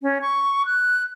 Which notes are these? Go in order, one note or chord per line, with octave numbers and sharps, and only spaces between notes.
C#4
C#6
F#6